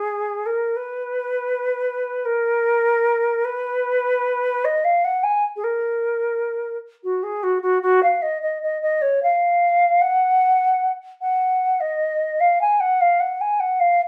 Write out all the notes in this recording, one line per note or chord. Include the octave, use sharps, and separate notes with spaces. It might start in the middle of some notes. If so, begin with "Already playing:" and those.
Already playing: G#4
A#4
B4
A#4
B4
D#5
F5
F#5
G#5
G#4
A#4
F#4
G#4
F#4
F#4
F#4
F5
D#5
D#5
D#5
D#5
C#5
F5
F#5
F#5
D#5
F5
G#5
F#5
F5
F#5
G#5
F#5
F5